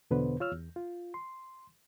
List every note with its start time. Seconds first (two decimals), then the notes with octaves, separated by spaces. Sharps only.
0.11 E2 B2 D3 B3 B4 C5
0.40 F4 C#5 E6 F6
0.52 E2
0.76 F4
1.14 C6